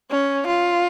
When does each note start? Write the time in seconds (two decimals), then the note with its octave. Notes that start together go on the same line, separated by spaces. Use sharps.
0.11 C#4
0.47 F4